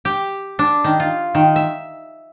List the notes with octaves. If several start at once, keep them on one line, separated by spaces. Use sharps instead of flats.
G4
D4
D#3
F4
D#3
E5